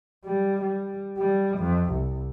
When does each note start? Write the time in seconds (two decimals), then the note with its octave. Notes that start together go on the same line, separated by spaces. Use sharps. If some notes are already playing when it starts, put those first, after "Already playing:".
0.25 G3
0.62 G3
1.18 G3
1.58 F2
1.91 C2